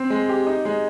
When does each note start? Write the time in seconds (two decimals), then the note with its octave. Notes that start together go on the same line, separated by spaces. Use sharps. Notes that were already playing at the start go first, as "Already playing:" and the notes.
Already playing: C4
0.10 G#3
0.29 G4
0.47 D#4
0.65 G#3